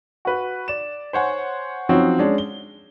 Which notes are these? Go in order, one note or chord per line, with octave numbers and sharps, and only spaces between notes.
F#4 B4
D5 E7
C5 C#5 F#5 G#5
F3 F#3 C4 C#4 D#4 F#4
G#3 C#4 D4
G7